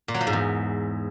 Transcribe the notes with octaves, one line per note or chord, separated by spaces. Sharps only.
A#2
F#3
F3
G#2
E2